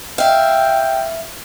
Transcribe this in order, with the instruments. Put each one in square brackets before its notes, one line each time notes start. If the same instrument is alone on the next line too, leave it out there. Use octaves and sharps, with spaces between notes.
[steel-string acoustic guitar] E5 F5 [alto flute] G5